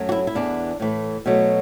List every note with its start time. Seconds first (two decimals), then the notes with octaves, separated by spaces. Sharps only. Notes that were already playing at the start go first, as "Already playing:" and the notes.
Already playing: F#2 F#3 A3
0.09 F#4
0.12 E4
0.27 E4
0.35 E2 E3 B3 D4
0.80 A2 E3 A3
1.26 B2 F#3 A3